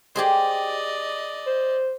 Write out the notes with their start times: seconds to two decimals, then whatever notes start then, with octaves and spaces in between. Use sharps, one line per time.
0.16 G4 G#4 C5 D5 D#5
1.46 C5